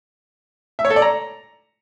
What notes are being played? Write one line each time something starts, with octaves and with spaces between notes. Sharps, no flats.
E5
C#5
A4
D5
A#5